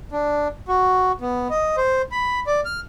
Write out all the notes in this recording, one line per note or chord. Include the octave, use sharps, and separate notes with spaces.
D4
F#4
B3
D#5
C5
B5
D5
F6